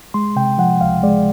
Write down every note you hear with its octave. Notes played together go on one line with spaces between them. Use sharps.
G#3 C6
C3 G5
F3 F#5
C#2 F5
G#3 D5